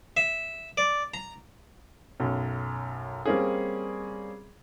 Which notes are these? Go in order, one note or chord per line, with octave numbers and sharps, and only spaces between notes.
E5
D5
A#5
B1 F#2
G3 A#3 C4 C#4 G#4